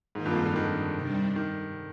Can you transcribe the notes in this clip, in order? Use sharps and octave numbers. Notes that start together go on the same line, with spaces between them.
G#2 D#3 A#3 F4 A#4
G2
F2
G2
D3
D#3
C3 G3 D4
D#3